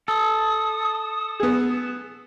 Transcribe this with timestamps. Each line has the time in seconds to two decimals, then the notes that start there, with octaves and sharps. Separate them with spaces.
0.08 A4 D#6
1.40 B3 G#4